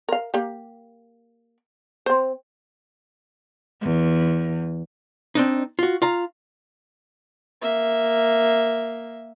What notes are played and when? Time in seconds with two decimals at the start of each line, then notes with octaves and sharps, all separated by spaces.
0.09 A#4 F5
0.34 A#3 G4
2.06 C4 C5
3.82 E2
5.35 C4 D4 D#4
5.79 F4 F#4
6.02 F4 F5 A#5
7.61 A#3 E5